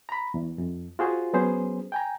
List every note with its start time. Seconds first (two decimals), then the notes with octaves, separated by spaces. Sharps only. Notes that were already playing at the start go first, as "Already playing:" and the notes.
0.09 A#5 B5
0.34 E2
0.58 F2
0.99 F4 F#4 G#4 C5
1.33 F#3 B3 C#4 G#4 C5
1.92 G5 G#5 A#5